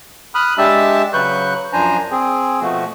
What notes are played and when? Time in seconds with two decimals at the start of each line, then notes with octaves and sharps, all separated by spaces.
0.35 B5 D#6 F6 F#6
0.58 G#3 D4 G4 E5 A5 E6
1.13 C#3 F#3 B4 C#6 F#6 G6
1.73 F#2 F3 D4 C5 G#5 A#5
2.11 C4 G#4
2.61 B2 F3 A3 F#4